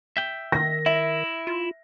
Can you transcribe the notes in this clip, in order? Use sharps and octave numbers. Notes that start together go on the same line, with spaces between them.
E5 G5
D#3 A#6
E4 E5
F4